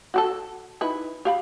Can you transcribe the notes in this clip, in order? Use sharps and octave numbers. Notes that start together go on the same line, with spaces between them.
F#4 G4 A4
D#4 E4 B4
G4 F5 B5